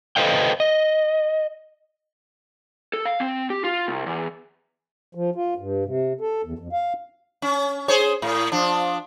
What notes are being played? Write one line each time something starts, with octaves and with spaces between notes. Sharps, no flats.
A4 B4 C5 D#5 F5 G5
D#5
A4
F5
C4
G4
F4
C2
E2
F3
F4
G2
C3
A4
E2
F2
F5
C#4
G#4 C5 C#5
A2
F3 D4